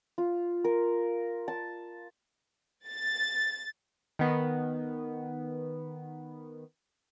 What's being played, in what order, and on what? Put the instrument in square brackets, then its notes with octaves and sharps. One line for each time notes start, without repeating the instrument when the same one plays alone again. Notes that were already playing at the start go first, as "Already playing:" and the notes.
[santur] F4
A#4
A5
[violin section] A6
[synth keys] D#3 B3